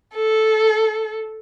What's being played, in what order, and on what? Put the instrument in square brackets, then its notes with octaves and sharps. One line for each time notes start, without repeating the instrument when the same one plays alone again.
[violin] A4